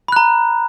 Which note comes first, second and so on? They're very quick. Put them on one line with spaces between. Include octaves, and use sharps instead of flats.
B5 F#6 A#5